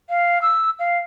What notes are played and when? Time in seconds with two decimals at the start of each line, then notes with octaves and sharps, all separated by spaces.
0.10 F5
0.42 E6
0.79 F5